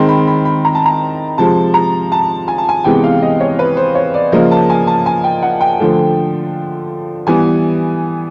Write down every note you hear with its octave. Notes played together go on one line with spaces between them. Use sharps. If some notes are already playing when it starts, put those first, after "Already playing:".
Already playing: D#3 G#3 C4 C6
B5
B5
B5
A#5
A5
A#5
C3 F3 G#3 A5
A#5
A5
G#5
A5
G#5
C3 E3 G#3 B3 G5
F5
D#5
C#5
B4
C5
C#5
D5
C#3 F3 A#3 D#5
A5
G#5
A5
G#5
G5
F#5
G5
D3 F3 A3
E3 G3 B3 G#5